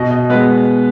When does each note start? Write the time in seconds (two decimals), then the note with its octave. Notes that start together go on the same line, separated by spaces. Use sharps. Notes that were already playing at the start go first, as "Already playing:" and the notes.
Already playing: B2 D#5
0.11 D#5
0.30 G#3 B3 B4